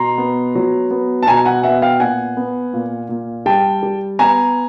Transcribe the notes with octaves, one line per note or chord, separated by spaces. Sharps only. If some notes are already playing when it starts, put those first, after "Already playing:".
Already playing: B2 A#5 C6
B3
F#3
B3
A5
B2 G#5 A#5
F#5 G#5
B3 E5 F#5
F5 G5
A#2 F#5 G#5
B3
A#2
A#2
G3 G5 A5
G3
B3 G#5 A#5